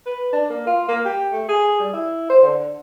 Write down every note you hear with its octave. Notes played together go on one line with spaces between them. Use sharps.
B4
D4
A#3
F4
A#3
G4
A3
G#4
G3
E4
C5
D3